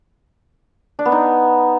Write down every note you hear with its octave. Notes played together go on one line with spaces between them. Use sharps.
D4
B3
D#4